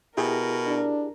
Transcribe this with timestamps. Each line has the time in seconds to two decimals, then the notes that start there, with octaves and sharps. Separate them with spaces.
0.17 B2 E4 G4 G#4 A#4
0.67 D4